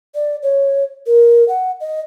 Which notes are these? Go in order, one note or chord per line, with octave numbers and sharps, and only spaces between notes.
D5
C#5
A#4
F#5
D#5